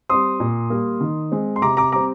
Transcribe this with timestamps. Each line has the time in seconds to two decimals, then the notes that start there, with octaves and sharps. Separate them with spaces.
0.10 G3 C4 C6 D#6
0.40 A#2
0.70 G3 A#3
1.01 D#3
1.32 G#3 C4
1.56 C6
1.62 C3 A#5 D6
1.77 A#5 D6
1.92 G3 C4 A#5 D6